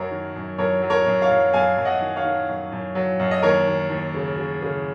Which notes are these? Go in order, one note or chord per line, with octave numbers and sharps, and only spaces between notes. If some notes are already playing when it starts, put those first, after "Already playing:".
Already playing: F#2 F#3 A#4 C#5
D#3
F#2
F#2 A#4 C#5
F#3
A#4 C#5
F#2
C#5 F5
F#2
F#2 F5 G#5
F#2
D#5 F#5
D#3
C#5 F5
D#3
F#2
F#2
F#3
F#2
D#5
D#2 A#4 C#5
D#2
D#2
C#3
C#3
C#3